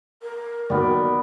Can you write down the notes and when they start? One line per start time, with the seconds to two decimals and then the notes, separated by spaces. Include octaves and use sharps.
0.22 A#4
0.70 D#2 D#3 F#3 B3 D5